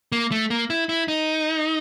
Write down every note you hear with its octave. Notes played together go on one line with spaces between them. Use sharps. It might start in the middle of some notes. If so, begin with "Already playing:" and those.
A#3
A3
A#3
E4
E4
D#4